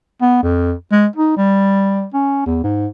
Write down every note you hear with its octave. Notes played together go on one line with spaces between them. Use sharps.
B3
F2
G#3
D#4
G3
C#4
E2
G#2